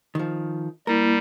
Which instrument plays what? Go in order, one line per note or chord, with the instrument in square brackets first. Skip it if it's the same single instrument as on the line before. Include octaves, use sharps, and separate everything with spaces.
[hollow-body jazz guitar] D#3 F3
[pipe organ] G3 [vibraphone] A#3 E4 [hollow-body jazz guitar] A#4